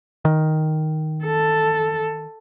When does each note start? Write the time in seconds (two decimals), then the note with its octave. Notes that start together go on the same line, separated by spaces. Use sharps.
0.25 D#3
1.25 A4